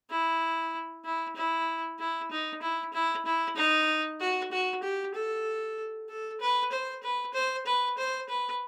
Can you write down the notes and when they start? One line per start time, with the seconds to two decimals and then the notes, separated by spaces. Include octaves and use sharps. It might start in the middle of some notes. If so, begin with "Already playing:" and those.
0.10 E4
1.05 E4
1.36 E4
2.00 E4
2.31 D#4
2.62 E4
2.93 E4
3.26 E4
3.56 D#4
4.20 F#4
4.52 F#4
4.83 G4
5.14 A4
6.09 A4
6.41 B4
6.72 C5
7.03 B4
7.34 C5
7.66 B4
7.98 C5
8.29 B4